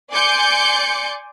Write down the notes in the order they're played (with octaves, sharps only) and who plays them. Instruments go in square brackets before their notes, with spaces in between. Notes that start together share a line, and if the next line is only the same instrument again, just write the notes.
[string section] D5 G#5 C6 D6 G6 C#7